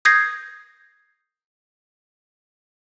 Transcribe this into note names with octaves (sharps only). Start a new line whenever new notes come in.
D#6 G6 G#6 A#6 C7